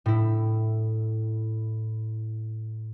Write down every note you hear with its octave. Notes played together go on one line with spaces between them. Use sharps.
A2 E4